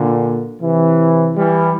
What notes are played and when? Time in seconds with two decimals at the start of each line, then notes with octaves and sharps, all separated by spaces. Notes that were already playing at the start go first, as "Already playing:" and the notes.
Already playing: A#2 D3
0.61 C3 E3
1.36 E3 G3